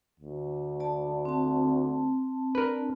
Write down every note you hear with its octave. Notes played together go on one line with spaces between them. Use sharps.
D2
D5 A5
C4 A5
D4 A#4 B4